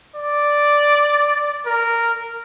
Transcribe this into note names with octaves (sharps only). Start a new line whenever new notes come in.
D5
A#4